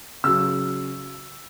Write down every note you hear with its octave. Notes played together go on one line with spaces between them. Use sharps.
C#3 F#3 E6